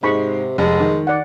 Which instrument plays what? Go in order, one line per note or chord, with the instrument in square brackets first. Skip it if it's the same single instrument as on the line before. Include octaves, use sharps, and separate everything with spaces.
[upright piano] G#2 G#3 [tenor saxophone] C3 [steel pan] D#5 B5 C#6
[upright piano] F1 [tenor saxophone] G#3
[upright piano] D#3
[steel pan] D5 F#5